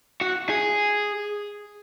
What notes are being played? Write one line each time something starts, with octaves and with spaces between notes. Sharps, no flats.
F#4
G#4